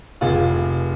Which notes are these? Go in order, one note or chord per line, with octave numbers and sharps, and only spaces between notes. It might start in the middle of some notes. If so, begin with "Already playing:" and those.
F1 F4 G#4